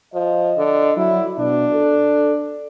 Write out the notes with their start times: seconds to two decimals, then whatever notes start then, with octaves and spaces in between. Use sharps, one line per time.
0.14 F3 D#5
0.57 D3
0.97 F#3 E4
1.38 B2 D4
1.74 A4